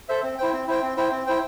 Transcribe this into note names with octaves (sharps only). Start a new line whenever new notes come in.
A4 C5 E5
C4
E4 C5 G5
C4
E4 C5 G5
C4
E4 C5 G5
C4
E4 C5 G5